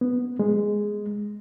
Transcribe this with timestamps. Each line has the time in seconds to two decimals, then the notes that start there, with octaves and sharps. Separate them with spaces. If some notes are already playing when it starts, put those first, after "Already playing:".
0.01 B3
0.39 G#3